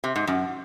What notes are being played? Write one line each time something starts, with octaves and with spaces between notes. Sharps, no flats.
C3
G#2
F#2